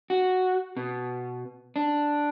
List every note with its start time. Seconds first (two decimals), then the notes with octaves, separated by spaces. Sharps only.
0.10 F#4
0.77 B2
1.76 D4